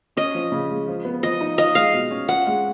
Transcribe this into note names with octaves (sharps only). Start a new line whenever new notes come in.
C#4 D#5
F3
C#3
G#3
F3
B3
F3 D#5
D#4
F4 D#5
G#3 F5
B2
C#4
F4 F#5
G#3